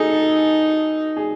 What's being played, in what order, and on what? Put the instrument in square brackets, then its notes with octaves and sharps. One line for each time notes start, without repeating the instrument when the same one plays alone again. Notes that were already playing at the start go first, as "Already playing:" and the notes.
Already playing: [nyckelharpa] D#4 [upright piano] G#4 A4
[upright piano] G#4